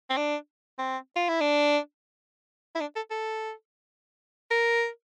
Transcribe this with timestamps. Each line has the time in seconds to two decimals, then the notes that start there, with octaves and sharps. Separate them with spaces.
0.10 C4
0.17 D4
0.78 C4
1.16 F4
1.29 E4
1.41 D4
2.75 E4
2.80 D4
2.96 A4
3.11 A4
4.50 A#4